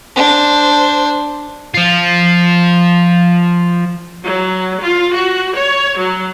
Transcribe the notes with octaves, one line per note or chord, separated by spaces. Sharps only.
D4 C5
F3 F4
F#3
F4
F#4
C#5
F#3